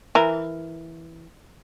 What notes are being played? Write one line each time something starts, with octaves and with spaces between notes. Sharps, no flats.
E3 A#4